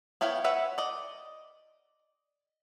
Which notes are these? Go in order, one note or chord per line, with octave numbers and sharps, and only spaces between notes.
B3 E4 C#5 F5 G5
B4 C#5 E5 F#5
D5 D#5